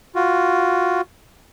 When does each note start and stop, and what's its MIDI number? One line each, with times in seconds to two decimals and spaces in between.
0.15 1.01 65
0.15 1.01 66